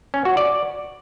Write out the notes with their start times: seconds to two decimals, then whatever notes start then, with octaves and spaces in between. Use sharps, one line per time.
0.14 C#4
0.25 F#4
0.37 D5